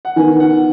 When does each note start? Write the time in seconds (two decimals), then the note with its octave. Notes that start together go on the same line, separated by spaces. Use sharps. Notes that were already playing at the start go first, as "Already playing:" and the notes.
0.05 F#5
0.16 D#3 B3 G#5
0.40 F#5